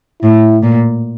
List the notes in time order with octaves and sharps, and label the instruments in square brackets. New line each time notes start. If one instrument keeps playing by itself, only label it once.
[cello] A2 [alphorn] E4
[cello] A#2